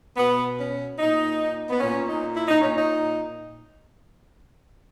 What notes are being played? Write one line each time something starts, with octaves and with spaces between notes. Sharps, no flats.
B2 B3
C#4
A#2 D#4
B3
A#2 C#4
D#4
E4
D#4
A#2 C#4
D#4